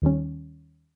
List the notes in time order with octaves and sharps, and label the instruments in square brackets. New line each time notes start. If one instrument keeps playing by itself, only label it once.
[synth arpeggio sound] D#2 D#3 G3 C#4